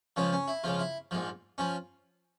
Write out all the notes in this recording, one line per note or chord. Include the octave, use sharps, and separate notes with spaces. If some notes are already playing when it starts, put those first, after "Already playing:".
C#2 C#3 F3 C#4
C#4
E4
C#2 C#3 F3 F4
E4
A#1 G#2 F3
F3 C#4